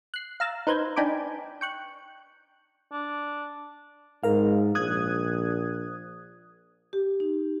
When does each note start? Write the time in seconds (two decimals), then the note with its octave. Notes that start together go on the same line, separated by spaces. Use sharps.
0.14 F#6 C7
0.40 F5 A#5 E6 A6
0.67 D#4 B4 C5 G6 G#6
0.96 D4 D#4 G5 G#5 B5 D6
1.61 G5 C#6 F#6
2.92 D4
4.23 G#2 A#4 F5
4.75 A#1 D#6 F#6 G#6
6.93 G4
7.20 D#4